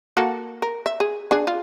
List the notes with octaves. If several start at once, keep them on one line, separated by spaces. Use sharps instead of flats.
A#3 F#4 A4
A#4
E5
G#4
D4 G#4
F4